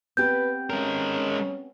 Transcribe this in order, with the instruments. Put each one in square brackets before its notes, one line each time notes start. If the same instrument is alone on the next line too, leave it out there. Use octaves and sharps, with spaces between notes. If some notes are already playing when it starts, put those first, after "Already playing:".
[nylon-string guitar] B3 C4 G4 [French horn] B4 [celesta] G6
[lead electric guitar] G#3 A#4 [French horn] C#4